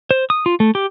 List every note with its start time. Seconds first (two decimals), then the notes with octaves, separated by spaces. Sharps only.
0.11 C5
0.30 D#6
0.46 F4
0.60 A3
0.75 G4